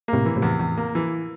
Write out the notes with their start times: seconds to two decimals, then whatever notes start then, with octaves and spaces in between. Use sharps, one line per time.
0.08 A#3
0.13 A2 C3
0.25 E3
0.36 A2 C3
0.42 E2
0.59 E2
0.77 A#3
0.95 E3